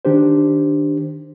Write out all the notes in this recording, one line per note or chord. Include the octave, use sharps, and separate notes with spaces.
D#3 D4 G4 C5